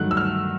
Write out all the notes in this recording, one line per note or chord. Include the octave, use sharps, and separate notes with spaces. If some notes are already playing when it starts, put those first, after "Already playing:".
Already playing: G2 D#3 F#3 A3 F#6
E6
F6